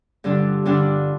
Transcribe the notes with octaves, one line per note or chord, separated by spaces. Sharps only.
G2 D3 G3 D4 F4
G2 D3 G3 D4 F4